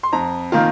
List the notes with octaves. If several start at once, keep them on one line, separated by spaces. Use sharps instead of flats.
C6
F2 A#5
D#3 A#3 F4